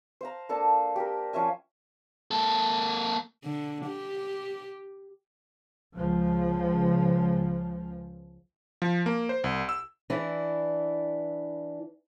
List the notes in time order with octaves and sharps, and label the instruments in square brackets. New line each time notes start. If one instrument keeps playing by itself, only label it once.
[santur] C5 F5 A#5
A#3 D4 A4 A5
G4 A#4
F3 C#4 E5 G#5
[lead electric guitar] A#3 A4
[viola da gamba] D3
G4
[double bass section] C#2 C#3 F3
[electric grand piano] F3
A#3
C5
C2
E6
[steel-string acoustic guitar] E3 D4 E4